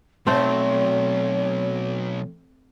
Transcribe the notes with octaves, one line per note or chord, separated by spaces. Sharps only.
B1 F#3 A3 C4 C#5